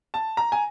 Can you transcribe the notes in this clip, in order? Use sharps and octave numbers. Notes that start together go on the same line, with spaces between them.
A5
A#5
G#5